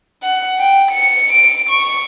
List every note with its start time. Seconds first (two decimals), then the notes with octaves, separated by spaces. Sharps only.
0.23 F#5
0.59 G5
0.91 C#7
1.33 D7
1.69 C#6